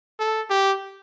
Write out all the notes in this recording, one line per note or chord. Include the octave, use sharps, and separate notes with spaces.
A4
G4